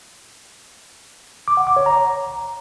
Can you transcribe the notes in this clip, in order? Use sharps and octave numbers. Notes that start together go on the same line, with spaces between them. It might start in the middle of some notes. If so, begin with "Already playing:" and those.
D6
F#5
D6
C#5
A#5